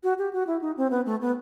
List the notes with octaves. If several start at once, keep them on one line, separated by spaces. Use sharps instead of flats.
F#4
G4
F#4
E4
D#4
C4
B3
A3
B3